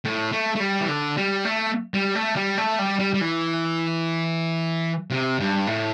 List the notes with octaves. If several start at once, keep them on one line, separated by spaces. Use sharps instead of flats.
A2
A3
A3
G3
E3
D3
G3
A3
G3
A3
G3
A3
G3
G3
G3
E3
C3
G2
A2